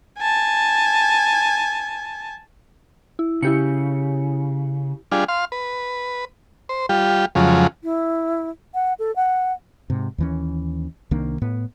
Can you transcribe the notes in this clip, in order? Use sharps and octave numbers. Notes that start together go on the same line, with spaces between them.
G#5 A5
E4
C#3 E4 G4 C#7
G3 D4 F4 G#4
F5 C6
B4
C5
G3 F4 G4
F2 C#3 F3 F#3 G#3
E4
F#5
A4
F#5
G#2 C3
D#2 E3 C#4
C2 D#3 A#3 D4
A2 B3